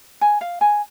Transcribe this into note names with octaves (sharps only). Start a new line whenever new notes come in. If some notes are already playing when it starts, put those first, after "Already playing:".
G#5
F5
G#5